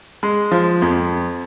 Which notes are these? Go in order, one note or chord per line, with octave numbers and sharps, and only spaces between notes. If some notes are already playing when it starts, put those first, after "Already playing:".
G#3
F3
F2